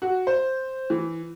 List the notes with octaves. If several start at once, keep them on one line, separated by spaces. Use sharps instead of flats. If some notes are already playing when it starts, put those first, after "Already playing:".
F#4
C5
E3